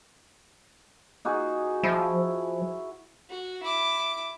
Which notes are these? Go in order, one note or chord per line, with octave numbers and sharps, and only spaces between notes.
D#4 F#4 G#4
F3 E4
F#4
E4 D6